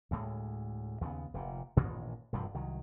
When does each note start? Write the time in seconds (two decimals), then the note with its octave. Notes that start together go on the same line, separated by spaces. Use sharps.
0.11 D2 A2 G#3
1.01 D#2 C#3 G3 B3
1.34 F1 A#2
1.76 A1 G2 A#2 D#3
2.33 E1 G2 C3 F3
2.54 C2 D#3 F#3